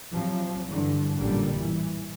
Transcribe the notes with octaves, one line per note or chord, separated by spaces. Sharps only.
C3 F3 F#3
G2 D3 E3
A1 F#2 A#2 D3 G3
E3